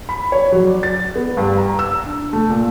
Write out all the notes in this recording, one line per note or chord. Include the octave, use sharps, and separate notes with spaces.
B5
C#5
F#3
D5
A6
B3
G2
A#5
E6
D4
A3
A#2